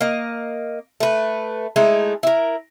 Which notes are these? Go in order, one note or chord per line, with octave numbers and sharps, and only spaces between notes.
A#3 D#5
A3 B4
G#3 A3 D#4 E4
E4 A#4